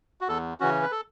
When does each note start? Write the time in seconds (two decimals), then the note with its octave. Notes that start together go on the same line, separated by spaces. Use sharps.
0.21 F#4
0.28 E2 A4
0.60 C#3 E3 C#4 F#4
0.82 B4
0.92 A4